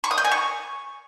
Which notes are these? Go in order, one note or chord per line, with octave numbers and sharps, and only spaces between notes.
C#6
D#6
G6
G#5
C#6